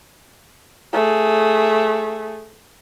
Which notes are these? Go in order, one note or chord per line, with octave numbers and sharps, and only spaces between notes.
A3 G#4